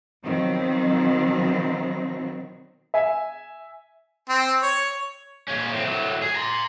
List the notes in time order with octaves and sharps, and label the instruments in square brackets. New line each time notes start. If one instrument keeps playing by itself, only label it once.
[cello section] B2 D#3 F3 F#3 C4
[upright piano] E5 G#5
[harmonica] C4
C#5
[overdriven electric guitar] A#2 C#4
A2 C4
A2 F#3
G#4
A#5 C6